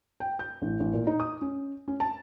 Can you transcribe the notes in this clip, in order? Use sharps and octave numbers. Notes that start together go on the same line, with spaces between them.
G5
G6
A1
A1
A#2
D#4
D#6
C#4
C#4
A5